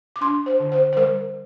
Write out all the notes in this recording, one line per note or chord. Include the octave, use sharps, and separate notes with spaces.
D6
D4 C6
C5
D3
C5
C5
G3 A#4